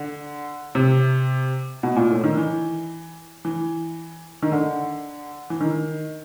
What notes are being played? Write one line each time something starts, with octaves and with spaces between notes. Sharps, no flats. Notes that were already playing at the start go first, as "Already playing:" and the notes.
Already playing: D3
C3
B2
A#2
A2
D#3
E3
E3
D#3
D3
E3
D#3